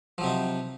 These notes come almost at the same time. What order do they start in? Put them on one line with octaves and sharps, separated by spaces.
F3 F#3 C3 D#4